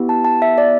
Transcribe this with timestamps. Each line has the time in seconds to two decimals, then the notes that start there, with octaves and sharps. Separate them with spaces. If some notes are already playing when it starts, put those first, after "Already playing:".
Already playing: B3 E4 G4
0.09 A5
0.25 A5
0.42 E5
0.58 D5